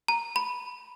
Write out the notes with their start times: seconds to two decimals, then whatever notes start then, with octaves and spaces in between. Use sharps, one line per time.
0.08 A#5
0.36 B5